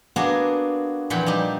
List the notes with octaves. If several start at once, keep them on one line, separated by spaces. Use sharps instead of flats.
A#3 B3 D4 F#4 G#4
F2 A#2 E3 F#5 G5 B5
G3 D4 D#4